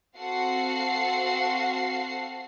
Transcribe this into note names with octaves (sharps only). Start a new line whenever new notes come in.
C4 F#4 A4 F5 F#5 C7